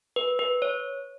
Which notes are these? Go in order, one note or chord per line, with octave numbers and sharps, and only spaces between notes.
B4
B4
C#5